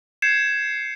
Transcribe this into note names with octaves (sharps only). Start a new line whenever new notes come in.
G6 G#6 C7 C#7 E7